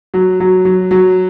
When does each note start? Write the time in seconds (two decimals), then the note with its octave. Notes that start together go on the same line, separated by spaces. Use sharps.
0.14 F#3
0.40 F#3
0.65 F#3
0.91 F#3